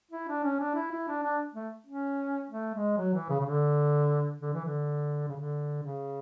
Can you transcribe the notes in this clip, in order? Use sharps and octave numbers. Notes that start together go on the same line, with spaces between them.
E4
D4
C#4
D4
E4
E4
D4
D4
A3
C#4
A3
G#3
F#3
E3
C#3
C#3
D3
D3
E3
D3
C#3
D3
C#3